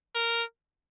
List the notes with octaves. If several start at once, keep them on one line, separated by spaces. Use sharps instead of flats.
A#4